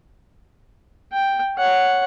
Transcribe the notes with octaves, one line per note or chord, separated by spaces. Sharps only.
G5
C#5 F#5